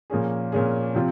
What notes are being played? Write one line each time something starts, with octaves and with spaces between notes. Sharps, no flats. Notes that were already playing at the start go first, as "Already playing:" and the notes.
A#2 F3 A#3 C#4 G#4
A#2 F3 A#3 C#4 G#4
C3 F3 C4 F4